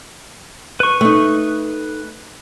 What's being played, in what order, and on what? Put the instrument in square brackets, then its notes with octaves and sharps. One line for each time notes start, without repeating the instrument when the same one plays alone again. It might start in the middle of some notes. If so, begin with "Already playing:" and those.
[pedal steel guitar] B4 C#6
[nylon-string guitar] A3 D#4